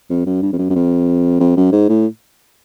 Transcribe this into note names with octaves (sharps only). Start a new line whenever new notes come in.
F2
F#2
G2
F2
F#2
F#2
F2
F2
F#2
G#2
A2